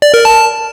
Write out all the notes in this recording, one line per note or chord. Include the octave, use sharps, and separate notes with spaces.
D5
A#4
A5